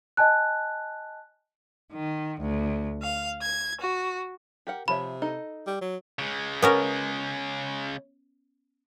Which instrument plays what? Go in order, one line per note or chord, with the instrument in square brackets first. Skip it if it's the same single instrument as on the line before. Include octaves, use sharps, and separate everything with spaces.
[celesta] D#5 G#5 A5 F#6
[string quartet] D#3
D2
F5
G#6
F#4
[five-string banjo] G4 A#4 F#5
[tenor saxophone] C3 [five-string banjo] F3 C#5 E5 [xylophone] B5
[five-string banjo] D#4 A4 D#5
[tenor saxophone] G3
F#3
[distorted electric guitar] C#3 G#3
[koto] B3 C#4 A#4